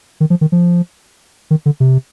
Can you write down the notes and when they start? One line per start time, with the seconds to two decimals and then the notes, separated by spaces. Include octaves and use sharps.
0.20 D#3
0.30 F3
0.41 D#3
0.52 F3
1.51 D#3
1.66 D3
1.80 C3